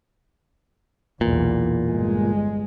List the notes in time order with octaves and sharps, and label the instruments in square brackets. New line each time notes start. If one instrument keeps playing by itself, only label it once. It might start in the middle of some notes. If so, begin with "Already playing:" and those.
[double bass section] B1 E2 [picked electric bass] A#2
[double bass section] G1 G#3